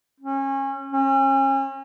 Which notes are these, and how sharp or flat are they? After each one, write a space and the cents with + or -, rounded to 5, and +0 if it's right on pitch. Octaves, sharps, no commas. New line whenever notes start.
C#4 -30
C#4 -35